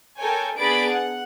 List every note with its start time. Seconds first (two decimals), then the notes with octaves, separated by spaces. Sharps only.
0.18 A4 A#4 C#5 G5 G#5
0.58 B3 D4 G#4 B5 A6 D7
0.89 F#5